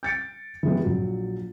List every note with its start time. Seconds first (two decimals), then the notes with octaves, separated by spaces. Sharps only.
0.03 G6 A6 C#7 D7
0.63 E3 F3 G3 G#3 B3
0.83 A#1 F#3